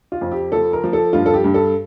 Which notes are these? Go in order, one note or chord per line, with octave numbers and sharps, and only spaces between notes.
F4
F2
G4
F3 A4
A#4
F3
A4
G2 F4
A4
G4
G2
A4